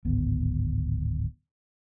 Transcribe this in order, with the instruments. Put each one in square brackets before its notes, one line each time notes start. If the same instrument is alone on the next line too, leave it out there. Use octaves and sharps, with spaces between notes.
[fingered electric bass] D1 G#1 B3